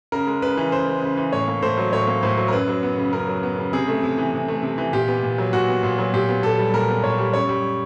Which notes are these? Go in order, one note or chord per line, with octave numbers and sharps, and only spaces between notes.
C#3 A#4
G#3
C#3 B4
E3
C#3 C5
G#3
C#3
E3
A2 C#5
A#3
A2 C5
F#3
A2 C#5
A#3
A2 C5
F#3
A#4
F#2 B4
F#3
B3
C#3
F#2 A#4
F#3
B3
C#3
C3 G#4
A3
C3
E3
C3
A3
C3
E3
A#2 G4
B3
A#2
F#3
A#2 F#4
B3
A#2
F#3
A#2 G4
B3
A#2 A4
G3
A#2 A#4
B3
A#2 C#5
G3
F#2 C#5
G3